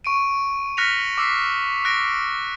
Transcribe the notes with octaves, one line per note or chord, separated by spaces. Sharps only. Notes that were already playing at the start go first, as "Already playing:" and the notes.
C#6 D7 D#7
F6 F#6 A#6 B6 C#7 F7
D6 E6 B6 C7
F#6 A#6 D7